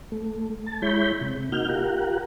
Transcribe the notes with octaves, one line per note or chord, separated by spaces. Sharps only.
A3
A5
G#3 E4 C#5 B5 G6
C3
A#3 D#4 F#4 F6 G6
F4 G4 A#4 F#5